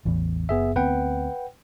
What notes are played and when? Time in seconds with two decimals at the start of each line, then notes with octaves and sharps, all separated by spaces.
0.05 A1 E2 C#3
0.49 F#1 B3 G#4 E5
0.76 D2 B3 C4 B4 F#5 G5